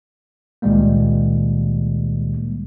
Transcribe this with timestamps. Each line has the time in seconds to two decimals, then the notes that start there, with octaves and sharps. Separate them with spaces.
0.62 C#2 A#2 D#3 G3 G#3 A#3